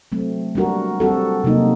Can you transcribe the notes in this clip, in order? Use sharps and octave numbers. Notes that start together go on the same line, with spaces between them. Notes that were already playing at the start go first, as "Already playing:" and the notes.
F#3 A3 C4
G3 D4 F#4 A#4
G3 C4 F#4 A4
C3 F#3 A#3 D#4